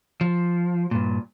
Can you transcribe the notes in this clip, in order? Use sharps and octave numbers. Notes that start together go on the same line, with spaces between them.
F3
G2 A#2